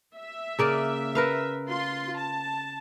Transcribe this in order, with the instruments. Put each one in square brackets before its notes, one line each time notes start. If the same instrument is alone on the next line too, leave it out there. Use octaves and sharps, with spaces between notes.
[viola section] E5
[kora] C#3 A#3 D5
A#4 B4 F5
[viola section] F4 C6
A5